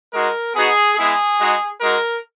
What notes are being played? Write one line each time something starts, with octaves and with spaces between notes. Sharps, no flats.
G#3 D#4 F#4 A#4
B3 D#4 F#4 G#4
G#3 B3 E4 G#4
G#3 D#4 F#4
G#3 D#4 F#4 A#4